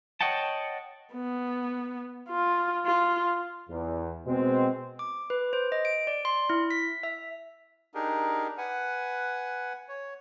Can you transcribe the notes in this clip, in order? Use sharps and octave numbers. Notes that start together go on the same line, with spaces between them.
C#5 D#5 F#5 G5 A5
B3
F4
F4
E2
B2 G#3 C4
D6
B4
C5
D#5
D7
D5
C6
E4
B6
E5
D4 D#4 G4 G#4 A#4
B4 F#5 G#5
C#5